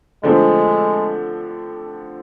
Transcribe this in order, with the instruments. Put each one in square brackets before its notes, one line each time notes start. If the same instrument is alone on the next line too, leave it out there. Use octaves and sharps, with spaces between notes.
[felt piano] D3 F3 A3 C4 [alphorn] G#3